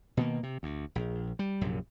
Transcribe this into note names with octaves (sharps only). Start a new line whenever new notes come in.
B2 D#3 A#3
C3
D2
A#1
G3
A#1 F#2 C3